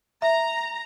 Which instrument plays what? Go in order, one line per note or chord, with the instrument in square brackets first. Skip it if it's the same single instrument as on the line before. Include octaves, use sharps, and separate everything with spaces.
[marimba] E5 [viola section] A#5